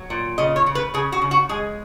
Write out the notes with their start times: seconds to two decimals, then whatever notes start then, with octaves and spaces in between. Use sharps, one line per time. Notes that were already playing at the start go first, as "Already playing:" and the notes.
Already playing: F#3
0.10 A#2
0.38 C#3 D#5
0.56 C#5
0.66 C#3
0.75 B4
0.94 C#3 G#4
1.12 F#4
1.22 C#3
1.31 F#4
1.49 G#3 G#4